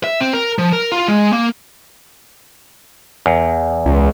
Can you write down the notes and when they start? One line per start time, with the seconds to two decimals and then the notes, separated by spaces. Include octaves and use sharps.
0.04 E5
0.21 C4
0.33 A#4
0.58 F3
0.72 A#4
0.92 F4
1.08 G#3
1.33 A#3
3.26 E2
3.86 C#2